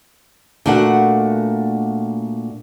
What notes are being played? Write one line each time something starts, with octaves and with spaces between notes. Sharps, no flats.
A#2 A3 D4 F#4 F#5